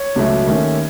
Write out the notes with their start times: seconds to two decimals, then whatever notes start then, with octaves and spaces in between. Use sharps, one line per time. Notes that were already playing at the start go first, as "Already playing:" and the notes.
Already playing: C#5
0.15 C#2 B2 F#3 A3
0.47 D#2 D#3 A3 C#4